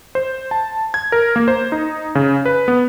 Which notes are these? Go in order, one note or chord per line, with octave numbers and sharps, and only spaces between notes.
C5
A5
G#6
A#4
A#3
C5
D#4
C#3
B4
B3